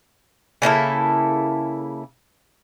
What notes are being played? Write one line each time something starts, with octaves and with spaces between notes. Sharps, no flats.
C#3 A#3 E4 A4